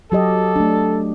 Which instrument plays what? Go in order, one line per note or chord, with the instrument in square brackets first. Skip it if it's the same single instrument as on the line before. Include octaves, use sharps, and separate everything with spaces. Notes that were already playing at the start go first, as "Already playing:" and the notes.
[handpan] F#3 G4 D#5 [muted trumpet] A4
[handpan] A3 D4